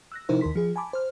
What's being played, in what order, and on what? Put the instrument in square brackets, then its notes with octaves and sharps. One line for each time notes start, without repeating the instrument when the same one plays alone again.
[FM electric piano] E6 F#6 A#6
C3 F3 D#4 E4 A#4 C5
D#2 D#3 A#4 C6 B6
F3 G#4
G#5 A5 B5 D6
C5 F6